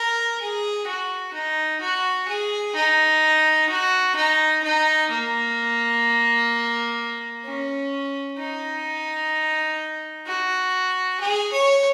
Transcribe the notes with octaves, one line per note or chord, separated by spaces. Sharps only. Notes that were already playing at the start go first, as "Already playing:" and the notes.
Already playing: A#4
G#4
F#4
D#4
F#4
G#4
D#4
F#4
D#4
D#4
A#3
C#4
D#4
F#4
G#4
C#5